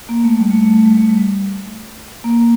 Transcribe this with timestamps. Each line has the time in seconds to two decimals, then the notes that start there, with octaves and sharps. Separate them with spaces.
0.09 A#3
0.24 A3
0.39 G3
0.50 A3
0.63 A3
0.74 A3
0.85 G3
0.97 A3
1.09 G3
2.24 A#3